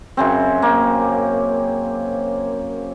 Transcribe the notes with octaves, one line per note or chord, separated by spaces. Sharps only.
F#2 C#3 C4
A#3